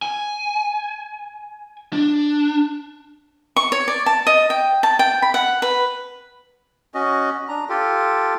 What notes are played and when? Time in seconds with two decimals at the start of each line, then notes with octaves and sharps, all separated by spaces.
0.02 G#5
1.93 D4
3.56 C#6
3.72 C#5
3.88 D5
4.06 A5
4.27 D#5
4.50 G5
4.83 A5
4.99 G5
5.22 B5
5.34 F#5
5.62 B4
6.94 C#4 F#4 D#5
7.49 D4 A#5
7.69 F4 G4 A4